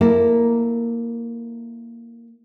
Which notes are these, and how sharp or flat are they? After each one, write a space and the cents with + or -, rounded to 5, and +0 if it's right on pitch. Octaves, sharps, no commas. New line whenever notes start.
A#3 +0 E4 +0 A4 +25